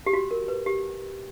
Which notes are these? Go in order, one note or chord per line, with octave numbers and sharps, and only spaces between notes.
G4
F#4
A#4
B4
G4